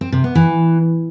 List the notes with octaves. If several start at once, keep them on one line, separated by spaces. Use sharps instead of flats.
C4
C3
B3
E3